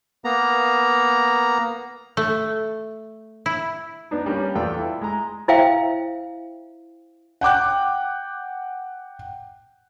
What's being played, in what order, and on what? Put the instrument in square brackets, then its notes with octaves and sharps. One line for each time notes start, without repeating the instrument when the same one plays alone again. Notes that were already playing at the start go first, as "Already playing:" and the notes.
[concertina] A#3 B3 A#5
[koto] A3
E4
[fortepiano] B3 D4 D#4
G3 A#3 C#4
E2 B3 F4 A4 D5 G5
E4
G#3 A#5
[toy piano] E4 C5 E5 F5 G5
[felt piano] F#5 G5 D6 F#6